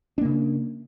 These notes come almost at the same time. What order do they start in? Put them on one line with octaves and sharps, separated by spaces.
D4 A#3 C#3